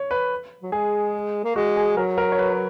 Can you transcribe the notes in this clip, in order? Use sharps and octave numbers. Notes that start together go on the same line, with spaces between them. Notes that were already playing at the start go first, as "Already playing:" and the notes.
Already playing: C#5
B4
F#3
G#3 G#4
A#3
G#3 F#4
G#4
F#3 A#4
A#4
C#5
B4